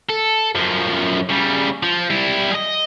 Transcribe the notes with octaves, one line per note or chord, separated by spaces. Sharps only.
A4
F#2 F3
C#3 G3
F3
G3 E4
G#4 D#5